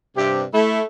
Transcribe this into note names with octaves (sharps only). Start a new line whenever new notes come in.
G2 C3 G4
A3 E4